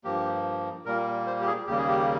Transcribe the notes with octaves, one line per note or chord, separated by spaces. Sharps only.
G2 F3 A#3 G4
A#2 G3 A#3 A#4
C5
G4
G#4
D#2 C#3 G3 A#3 G4
G#4
G4